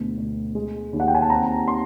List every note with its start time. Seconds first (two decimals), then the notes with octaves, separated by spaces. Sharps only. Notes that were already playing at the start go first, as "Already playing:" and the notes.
Already playing: D2 B2
0.18 D2
0.55 G#3
0.93 D#2
1.00 F#5
1.08 G5
1.15 G#5
1.22 A5
1.30 C4 A#5
1.68 C6